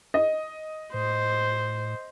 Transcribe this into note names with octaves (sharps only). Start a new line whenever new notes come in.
D#5
A2 C5